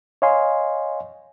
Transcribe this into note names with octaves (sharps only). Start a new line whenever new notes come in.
C#5 D#5 F5 G#5 C6